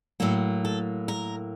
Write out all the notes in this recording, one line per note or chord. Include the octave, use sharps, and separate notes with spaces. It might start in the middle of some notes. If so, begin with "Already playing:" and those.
A2 F#3 A#3 A4
A4
A#4